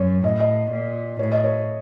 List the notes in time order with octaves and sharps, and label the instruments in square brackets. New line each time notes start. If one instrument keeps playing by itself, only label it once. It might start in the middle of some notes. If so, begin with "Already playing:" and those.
Already playing: [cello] F#2 [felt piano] C#5
[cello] A2 [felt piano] D#5
[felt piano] D#5
[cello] A#2
[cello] A2 [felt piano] C#5
[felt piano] D#5
C#5